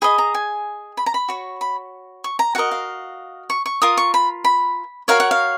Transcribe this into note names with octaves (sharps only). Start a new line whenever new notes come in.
G#4 D#5 B5
A#5
G#5
B5
A#5
B5
F#4 C#5
B5
C#6
A#5
F#4 A#4 D#5 F#5
F5
C#6
C#6
F4 A#4 D#6
C#6
B5
B5
F#4 A#4 C#5 F5
F#5
F5